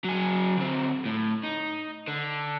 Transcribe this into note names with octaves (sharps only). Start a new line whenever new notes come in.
F#3 G#4
D2 C4
A2
D#4
D3